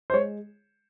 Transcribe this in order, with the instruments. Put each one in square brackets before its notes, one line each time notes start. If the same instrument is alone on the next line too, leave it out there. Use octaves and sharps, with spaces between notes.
[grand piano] C5
G#3 C#5